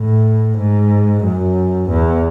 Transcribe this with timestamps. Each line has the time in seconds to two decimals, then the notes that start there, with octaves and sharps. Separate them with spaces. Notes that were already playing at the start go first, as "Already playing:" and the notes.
Already playing: A2
0.58 G#2
1.24 F#2
1.89 E2